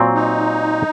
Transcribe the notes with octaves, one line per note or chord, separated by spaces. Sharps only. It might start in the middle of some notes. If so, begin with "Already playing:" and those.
Already playing: A#2 F#3 C4
D#4